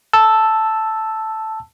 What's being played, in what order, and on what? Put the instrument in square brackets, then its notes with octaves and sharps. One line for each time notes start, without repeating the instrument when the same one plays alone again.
[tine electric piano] A5 E6